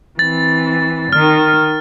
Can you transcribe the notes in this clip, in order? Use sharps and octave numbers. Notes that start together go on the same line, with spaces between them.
E3 C4 A6
D#3 F6